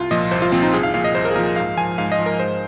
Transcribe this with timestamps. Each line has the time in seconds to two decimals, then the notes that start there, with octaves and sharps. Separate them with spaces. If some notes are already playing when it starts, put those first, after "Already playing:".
Already playing: C2 F4
0.11 A#2 F3 D#5
0.31 C2 C5
0.42 F4
0.52 A#2 F3 C4
0.63 D#4
0.73 C2 G#4
0.83 F5
0.94 A#2 F3 F5
1.04 D#5
1.15 C2 C5
1.25 A#4
1.31 G#4
1.36 A#2 F3 A#4
1.56 G#2 F5
1.77 F3 G#5
1.98 G#2 F5
2.12 D#5
2.19 F3
2.26 A#4
2.40 G#2 C5